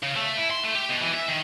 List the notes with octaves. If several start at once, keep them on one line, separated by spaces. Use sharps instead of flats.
C#3
A3
E4
C6
A3
G4
B2
E3
E5
D#3